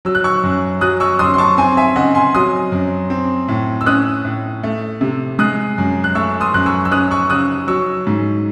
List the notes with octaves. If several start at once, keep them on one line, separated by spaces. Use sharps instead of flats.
F#3 E6
F#6
C#6 E6
F#2
F#3 D#6 F#6
C#6 E6
F#2 C6 D#6
C6
A5 C#6
C4 G#5 C6
E5 G#5
C#3 D#5 F#5
G#5 C6
F#3 C6 D#6
F#2
C4
A2
E6
C#4 D#6 F#6
A2
A3
C3
G#3 D#6 F#6
F#2
F#6
A3 C#6 E6
C6 D#6
F#2 F#6
C#6 E6
E6
C#4 D#6 F#6
C#6 E6
C#3 D#6 F#6
F#3 C#6 E6
G#2